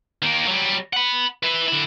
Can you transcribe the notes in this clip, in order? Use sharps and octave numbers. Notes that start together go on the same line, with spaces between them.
D#3 A#3
F#3 G3
F#5 B5
B4 E5
D3 E4